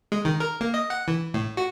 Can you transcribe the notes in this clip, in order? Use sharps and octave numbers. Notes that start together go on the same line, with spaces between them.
G#3
D#3
A#4
A#3
D#5
F#5
E3
A2
F#4